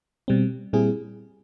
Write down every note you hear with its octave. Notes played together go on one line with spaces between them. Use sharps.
B2 G3 C4
A#2 G3 C4 E4 G#4